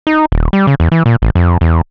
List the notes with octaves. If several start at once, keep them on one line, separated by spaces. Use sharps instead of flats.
D#4
D#1
G3
C#3
E2
E3
A#2
A1
F2
E2